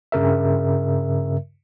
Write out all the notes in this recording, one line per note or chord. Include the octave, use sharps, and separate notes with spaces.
G2 C#3 A#4 E5